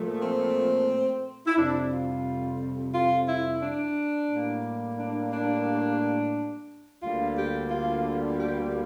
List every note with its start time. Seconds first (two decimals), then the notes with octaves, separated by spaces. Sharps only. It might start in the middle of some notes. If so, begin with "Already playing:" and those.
Already playing: A#2 F3 A3
0.21 C4
1.46 E4
1.57 F2 C3 G3 D4
1.92 F4
2.94 F4
3.27 E4
3.61 D4
4.30 A2 G3 A#3
4.98 D4
5.32 D4
7.03 D2 D3 G3 A#3 F4
7.37 G4
7.71 F4
8.39 G4